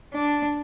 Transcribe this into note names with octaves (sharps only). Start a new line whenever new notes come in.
D4